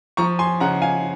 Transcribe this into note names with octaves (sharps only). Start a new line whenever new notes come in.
F3 A#5 C#6
G#5 C6
C#3 F#5 A#5
F5 G#5